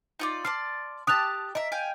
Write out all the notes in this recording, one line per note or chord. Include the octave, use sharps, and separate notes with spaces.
D#4 F4 D5
D5 A5 C6 F6
G4 A5 D#6 F#6 F7
A#4 D#5 E5
F5 G5 G#5